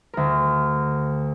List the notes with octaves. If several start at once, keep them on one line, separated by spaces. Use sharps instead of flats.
D2 A#4